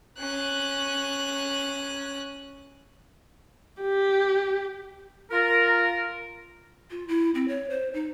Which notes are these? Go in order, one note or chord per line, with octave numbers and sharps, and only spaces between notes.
C#4 F#6
G4
F4 A#4
F4
E4
C4
C#5
C5
D#4